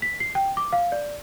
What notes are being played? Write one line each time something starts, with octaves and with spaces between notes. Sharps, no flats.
B6
C7
G5
D6
F5
D5